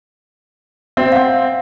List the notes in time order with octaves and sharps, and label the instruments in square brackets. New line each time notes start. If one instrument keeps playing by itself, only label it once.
[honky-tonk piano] C4 [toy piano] E5
[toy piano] F5 F#5